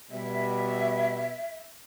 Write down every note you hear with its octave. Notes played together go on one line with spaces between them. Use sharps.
B2 G3 E5